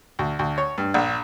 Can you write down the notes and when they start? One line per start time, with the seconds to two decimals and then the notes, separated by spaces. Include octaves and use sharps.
0.19 D2
0.39 D2
0.58 C#5
0.78 G2
0.94 A#1